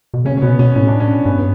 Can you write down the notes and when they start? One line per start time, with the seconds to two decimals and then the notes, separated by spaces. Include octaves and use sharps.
0.14 B2
0.25 C#3 C#4
0.37 C#4
0.42 B2 B3
0.59 B2 C#4
0.75 A2 C#4
0.88 D4
1.00 C#4
1.25 G2 B3